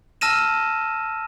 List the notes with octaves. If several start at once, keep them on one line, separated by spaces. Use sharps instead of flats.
A5 E6 F6 A#6 D#7 E7